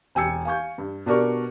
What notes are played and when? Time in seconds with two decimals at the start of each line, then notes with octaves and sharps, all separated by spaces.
0.15 E1 G5 G#5 E6 C#7
0.45 F5 G#5 C#6 G6
0.78 G2
1.06 B2 D4 G4 A#4 D5 C#6